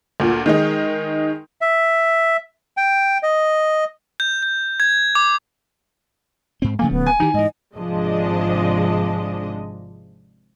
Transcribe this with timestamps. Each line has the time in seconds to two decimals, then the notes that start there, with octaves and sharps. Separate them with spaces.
0.20 D2 A#2
0.46 D#3 G#3 D#4
1.61 E5
2.77 G5
3.23 D#5
4.20 G6
4.43 G6
4.80 G#6
5.15 D6
6.62 G#2 C4
6.79 C#3 F3 A3 A#3 G#5
6.91 D1 B3
7.06 G#5
7.20 D#3 E3 D#4 G4
7.34 G#2 E3 D#5
7.77 G#1 C3 F3 G#3 D4 D#5